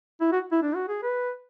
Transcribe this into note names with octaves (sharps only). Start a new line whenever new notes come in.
E4
F#4
E4
D4
F#4
G#4
B4